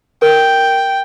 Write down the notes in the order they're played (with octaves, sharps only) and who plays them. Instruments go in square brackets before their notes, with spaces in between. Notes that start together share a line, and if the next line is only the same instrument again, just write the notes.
[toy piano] A#4 [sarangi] G5